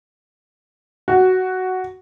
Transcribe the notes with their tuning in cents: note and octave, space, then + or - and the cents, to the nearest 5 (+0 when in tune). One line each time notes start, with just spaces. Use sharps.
F#4 +5